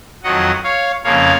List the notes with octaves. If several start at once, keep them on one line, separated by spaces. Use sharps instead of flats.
F2 D#3 F#3 D#5 F#5
C#5 F5
F2 C#3 F3 A#3 C#5 F5